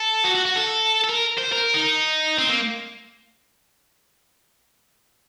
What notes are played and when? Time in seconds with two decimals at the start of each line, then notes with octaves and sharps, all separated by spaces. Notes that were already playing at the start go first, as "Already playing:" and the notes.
Already playing: A4
0.24 F#4
0.35 F#4
0.45 F#4
0.56 A4
1.04 A4
1.09 A#4
1.38 C5
1.52 A#4
1.74 D#4
2.38 C4
2.49 A#3